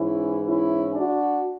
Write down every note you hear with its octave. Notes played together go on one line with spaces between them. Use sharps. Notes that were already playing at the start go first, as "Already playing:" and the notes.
Already playing: G#2 E3 C#4 E4
C#4 E4
D4 F#4